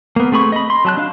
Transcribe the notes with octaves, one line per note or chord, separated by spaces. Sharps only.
A#3 B3
A3 C4 G#4 B5 C#6
D#5 B5
C6
F#3 A5 F#6
D4 D#5 F5